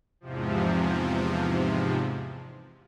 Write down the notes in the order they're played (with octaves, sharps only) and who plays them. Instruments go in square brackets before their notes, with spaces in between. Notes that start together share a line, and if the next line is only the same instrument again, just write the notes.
[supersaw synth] E2 G#2 C3 F3